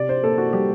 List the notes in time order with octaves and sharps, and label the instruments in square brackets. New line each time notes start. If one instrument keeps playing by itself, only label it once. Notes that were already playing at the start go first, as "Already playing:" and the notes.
Already playing: [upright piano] C3 D5
C5
A#3 A4
F#4
G3 G4